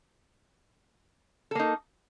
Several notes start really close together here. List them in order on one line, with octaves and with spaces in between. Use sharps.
A4 A#3 D#4